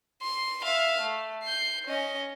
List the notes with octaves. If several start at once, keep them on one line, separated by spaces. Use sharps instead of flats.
C6
E5 F5
A3
G6 C7
C#4 D#5